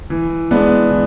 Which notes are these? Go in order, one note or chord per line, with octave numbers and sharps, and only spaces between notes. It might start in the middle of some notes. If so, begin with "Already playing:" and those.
E3
G#3 B3 D4
E3